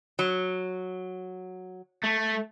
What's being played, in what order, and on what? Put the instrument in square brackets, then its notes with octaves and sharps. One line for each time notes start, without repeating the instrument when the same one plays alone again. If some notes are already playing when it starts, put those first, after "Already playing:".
[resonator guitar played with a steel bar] F#3
[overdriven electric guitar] A3